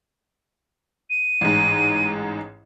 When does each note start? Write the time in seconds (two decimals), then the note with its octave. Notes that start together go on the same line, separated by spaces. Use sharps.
1.10 D#7
1.41 A1 G#2